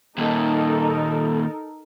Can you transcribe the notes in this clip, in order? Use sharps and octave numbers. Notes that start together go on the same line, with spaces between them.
D#2 A#2 D#4 A4 A#4